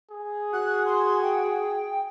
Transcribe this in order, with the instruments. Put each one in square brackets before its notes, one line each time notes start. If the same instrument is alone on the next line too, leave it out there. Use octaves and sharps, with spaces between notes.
[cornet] G#4
[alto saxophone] F#4 [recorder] F#6
[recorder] C6
G5